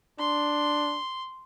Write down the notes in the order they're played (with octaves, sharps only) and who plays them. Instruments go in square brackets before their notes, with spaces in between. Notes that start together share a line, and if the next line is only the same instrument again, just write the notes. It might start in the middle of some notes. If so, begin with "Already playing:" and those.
[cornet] D4 [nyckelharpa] C6